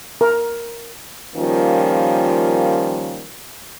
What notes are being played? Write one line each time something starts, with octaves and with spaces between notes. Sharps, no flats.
A#4
D#3 F3 G3 A#3 C#4 F4